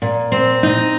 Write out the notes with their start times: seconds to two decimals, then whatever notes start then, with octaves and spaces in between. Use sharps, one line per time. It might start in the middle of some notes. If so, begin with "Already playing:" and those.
0.02 A#2
0.32 C4
0.63 D#4